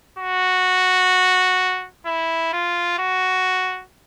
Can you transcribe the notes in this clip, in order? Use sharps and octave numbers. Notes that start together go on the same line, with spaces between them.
F#4
E4
F4
F#4